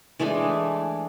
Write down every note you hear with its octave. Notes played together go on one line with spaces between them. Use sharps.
E3 G#3 A3 D4